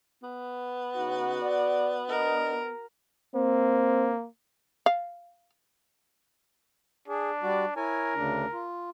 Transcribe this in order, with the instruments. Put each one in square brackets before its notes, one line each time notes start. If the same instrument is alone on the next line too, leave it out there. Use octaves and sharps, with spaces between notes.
[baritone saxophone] B3
[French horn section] C#3 D#4 [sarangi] F#4
[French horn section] D5
[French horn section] D4 D#5 [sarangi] A#4
[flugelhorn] A#3 [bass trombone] C4
[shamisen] F5
[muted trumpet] D4 [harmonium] G#4
[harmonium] G3 F#4 D5
[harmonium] E4 C#5 G#5 [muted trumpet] A#4
[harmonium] D2 C#3 D4
F4